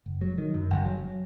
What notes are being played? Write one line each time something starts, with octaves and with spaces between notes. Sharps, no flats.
F#1
F#3
D#3
F#2
F#1
F#3